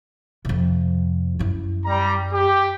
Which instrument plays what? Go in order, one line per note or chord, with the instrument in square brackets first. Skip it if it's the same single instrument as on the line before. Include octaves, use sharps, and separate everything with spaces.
[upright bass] F2 C3
F#2 E4
[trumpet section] G3 A#5
G4